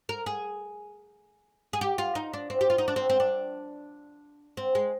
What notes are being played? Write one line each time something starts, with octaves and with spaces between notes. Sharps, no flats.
A#4
G#4
G#4
G4
F4
D#4
D4
C4
G4
F4
D#4
D4
C4
C4
D4
C4
G#3